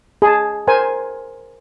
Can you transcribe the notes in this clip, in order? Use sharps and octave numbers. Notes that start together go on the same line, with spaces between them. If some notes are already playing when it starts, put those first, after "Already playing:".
G#4 A5
A#4 C5 G#5